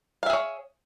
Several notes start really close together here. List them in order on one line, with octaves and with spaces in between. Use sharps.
F5 E5 G#4 C#5